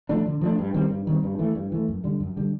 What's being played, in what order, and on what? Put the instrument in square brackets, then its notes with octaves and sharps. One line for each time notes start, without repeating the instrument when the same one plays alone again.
[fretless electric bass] F3 A3 D4
D3
F3 A3 D4
G2
D#3 G3 C4
G2
D#3 G3 C4
G2
E3 A3
G2
E3 A3
F#2
D3 G3
F#2
D3 G3